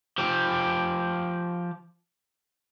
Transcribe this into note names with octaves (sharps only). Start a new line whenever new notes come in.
F3 G4